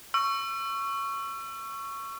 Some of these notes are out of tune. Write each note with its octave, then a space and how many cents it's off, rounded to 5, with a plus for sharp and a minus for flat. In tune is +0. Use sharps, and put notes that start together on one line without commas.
C#6 +0 E6 +35